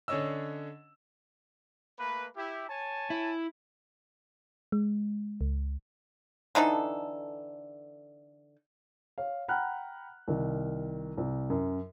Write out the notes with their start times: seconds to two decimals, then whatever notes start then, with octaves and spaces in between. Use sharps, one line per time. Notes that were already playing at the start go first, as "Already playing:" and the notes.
0.08 D3 C#4 D4 C#5 D#5 E6
1.98 A3 A#3 B4
2.35 E4 G4
2.69 C#5 G#5 A5
3.10 E4
4.72 G#3
5.41 C#2
6.55 D3 E3 D#4 A4
9.18 C#5 F5
9.48 F#5 G5 A#5 B5 F6 F#6
10.28 C2 D#3
11.18 C2
11.50 F#2